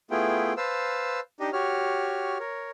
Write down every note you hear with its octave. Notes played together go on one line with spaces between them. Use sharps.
A3 B3 E4 F4 G#4 G5
B4 C5 F5 A5 E6
D4 D#4 G4 D#5
F#4 G4 C#5 F6
A#4 C#5